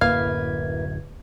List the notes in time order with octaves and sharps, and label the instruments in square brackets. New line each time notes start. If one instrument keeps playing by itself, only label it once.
[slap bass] D1 F#2 [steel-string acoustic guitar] A#3 E4 B4 [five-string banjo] F5 [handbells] G#6